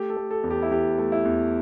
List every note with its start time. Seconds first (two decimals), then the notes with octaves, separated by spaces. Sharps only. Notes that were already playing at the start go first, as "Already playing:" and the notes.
Already playing: A3 G4
0.10 A4
0.17 A3
0.31 A4
0.44 E2
0.50 G4
0.63 E4
0.71 E2 G4
0.98 A3
1.12 E4
1.25 E2